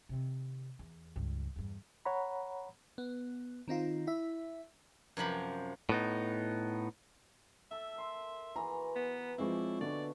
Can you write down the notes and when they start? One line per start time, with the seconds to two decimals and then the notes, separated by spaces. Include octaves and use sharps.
0.09 C3 D#3
0.79 E2
1.16 C#2 G2
1.56 E2 G2
2.05 C#5 F#5 A#5 B5
2.98 B3
3.68 D#3 C4 D#4 F4
4.07 E4 E5
5.17 F#2 C3 F3 B5
5.89 A2 B3 D#4
7.71 A4 E5
7.96 A#4 C6
8.56 E3 F#4 G#4 A#5
8.96 B3
9.38 F3 G#3 C4 E4 C#5 D5 F5
9.81 B2 D3 A3 D5